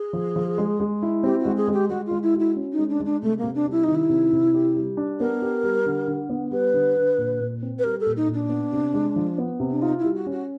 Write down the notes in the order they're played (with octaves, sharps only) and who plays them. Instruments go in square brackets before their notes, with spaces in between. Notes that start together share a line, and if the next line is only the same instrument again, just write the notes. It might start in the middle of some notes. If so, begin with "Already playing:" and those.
Already playing: [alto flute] G#4
[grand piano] F3
F3
G#3
G#3
E4
[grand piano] C4 [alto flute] G4
[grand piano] G#3 [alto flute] F#4
[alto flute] G#4
[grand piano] G#3
[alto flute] G4
[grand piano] G#3 [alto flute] F#4
[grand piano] G#3 [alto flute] F4
[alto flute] E4
[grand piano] F#4
[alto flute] E4
[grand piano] C#4
[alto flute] D#4
[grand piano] G#3
[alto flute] D4
[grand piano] G#3
[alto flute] D4
[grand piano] C3 [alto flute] A3
[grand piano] C3 [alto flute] A#3
[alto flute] D4
[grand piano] G3
[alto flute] E4
[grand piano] D#3 [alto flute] D#4
[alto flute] E4
[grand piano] C3
C3
G4
G3
D4
[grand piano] B3 [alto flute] A#4
[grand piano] G4
G3
D3
D3
B3
[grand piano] G3 [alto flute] B4
[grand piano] D3
D3
A#2
A#2
C4
[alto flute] B4
[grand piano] G3 [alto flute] A#4
[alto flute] A4
[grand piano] A#2
[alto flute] D#4
[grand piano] A#2
[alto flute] D4
[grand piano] B3
C3
G#3
F3
B3
C3
[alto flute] D4
[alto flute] D#4 [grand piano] F4
[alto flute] E4
[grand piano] G3
[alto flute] F#4
[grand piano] C#4
[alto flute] F#4